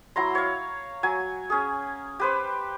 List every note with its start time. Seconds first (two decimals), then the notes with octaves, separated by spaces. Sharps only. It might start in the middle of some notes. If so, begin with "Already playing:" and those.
0.16 F#3 E4 A#5 C6
0.35 C#5 F5
1.03 F#3 G#5
1.50 C#4 G#4
2.20 G4 B4 C5